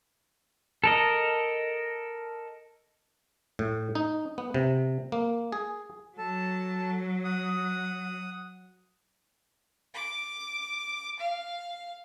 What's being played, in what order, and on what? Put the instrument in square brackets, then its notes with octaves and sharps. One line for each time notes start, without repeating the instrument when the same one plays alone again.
[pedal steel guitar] A4 A#4 D#5
[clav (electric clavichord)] A2
D#4
B3
C3
A#3
G#4
[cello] F#3 [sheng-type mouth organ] A4 A5
[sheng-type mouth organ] F#5 D#6
[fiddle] D6
F5